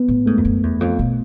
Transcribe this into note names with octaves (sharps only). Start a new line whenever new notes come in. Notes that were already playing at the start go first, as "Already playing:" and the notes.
Already playing: B3
A2
G#2 A3
F2
F#2
E2
F2
B2